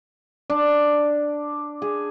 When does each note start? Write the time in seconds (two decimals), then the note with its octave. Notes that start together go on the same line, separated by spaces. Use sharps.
0.50 D4
1.82 G#4